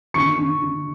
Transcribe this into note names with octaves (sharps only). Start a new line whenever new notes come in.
D3 C#6 C#7
D3
D3